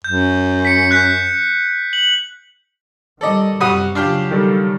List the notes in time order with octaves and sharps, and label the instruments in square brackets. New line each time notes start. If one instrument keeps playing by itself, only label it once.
[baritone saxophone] F#2 [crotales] G6
[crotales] B6 C#7
F#6 G6 B6
F#7
[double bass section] D#3 G3 [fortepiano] A4 D5 D#5
[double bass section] F#2 C3 [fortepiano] G3 F#4 D#6
[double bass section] C#3 F#3 [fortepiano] D4 F4 G4
[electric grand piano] D#3 G3 A4